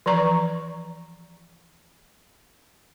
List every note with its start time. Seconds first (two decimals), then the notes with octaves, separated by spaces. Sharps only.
0.06 E3 F3 D5 A#5 C#6